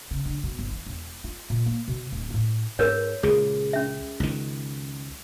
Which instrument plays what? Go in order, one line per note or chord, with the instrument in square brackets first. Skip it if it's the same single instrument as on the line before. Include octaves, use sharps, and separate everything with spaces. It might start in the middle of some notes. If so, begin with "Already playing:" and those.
[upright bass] C#3
D3
B2
G1
E3
E1
F4
A#2
A#3
B2
D1
A2
[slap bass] G#2 [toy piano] A#4 B4 C#5
[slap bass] C#2 A#2 [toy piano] G#4
[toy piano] C#4 E5
[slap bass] C#2 D#3